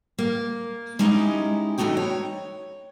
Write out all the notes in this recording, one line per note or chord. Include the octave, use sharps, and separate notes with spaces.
A#3
G#3 C#4 D#4 E4 G4 G#4
E2 F3 A3 D#4 F#4 G5
C#5